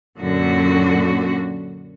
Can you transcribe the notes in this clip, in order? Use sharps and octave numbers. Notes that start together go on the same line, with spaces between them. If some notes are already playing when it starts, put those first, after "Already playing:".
F#2 A#2 D3 F#4